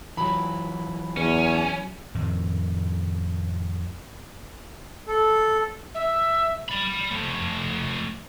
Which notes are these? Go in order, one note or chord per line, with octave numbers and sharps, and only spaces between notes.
E3 F#3 B5
E2 C#4
F2 A2 D#3
A4
E5
D5 B5
F3 A3